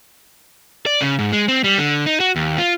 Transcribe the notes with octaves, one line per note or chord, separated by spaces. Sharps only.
D5
C#3
G#2
G#3
C4
G3
D3
D#4
F#4
D#2
F4